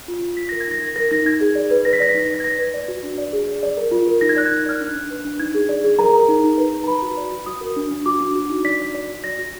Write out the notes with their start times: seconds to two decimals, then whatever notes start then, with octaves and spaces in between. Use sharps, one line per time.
0.08 F4
0.22 F4
0.37 F4 B6
0.49 A#4 A#6
0.61 G#6
0.67 D#4 A#6
0.82 A#4
0.96 A#4 A#6
1.11 D#4 A#6
1.25 D#4 G#6
1.41 G#4
1.55 D5
1.71 B4
1.85 B4 A#6
1.93 B6
2.00 D5 A#6
2.09 B6
2.15 D#4 A#6
2.26 B6
2.29 B4 A#6
2.40 G#6
2.44 B4 A#6
2.59 B4
2.74 D5
2.88 F#4
3.03 D4
3.18 D5
3.33 G#4
3.47 D5
3.63 D5
3.77 A#4
3.91 F4
4.07 A#4
4.21 D#4 A#6
4.29 G#6
4.36 D5 F#6
4.46 G#6
4.51 D#4
4.66 D5 F6
4.81 D4 F#6
4.95 D4
5.10 B4
5.25 D4
5.39 D#4 G#6
5.55 G#4
5.69 D5
5.84 G#4
5.99 A#4 A#5
6.13 A#4
6.29 D#4
6.44 D#4
6.58 B4
6.73 D#4
6.84 A#5
6.87 B4 B5
7.02 F#4
7.17 D5
7.32 F#4
7.46 F#4 D#6
7.61 A#4
7.76 D4
7.91 D4
8.06 F#4 D6
8.21 D4
8.35 F#4
8.50 D#4
8.64 D5 B6
8.80 D5
8.95 D5
9.10 F#4
9.24 D5 A#6
9.39 F#4